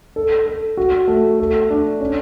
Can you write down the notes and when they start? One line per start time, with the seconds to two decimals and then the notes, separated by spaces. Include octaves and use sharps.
0.16 A4
0.47 A4
0.77 F#4
1.08 A3
1.39 A4
1.70 D4
2.00 C#4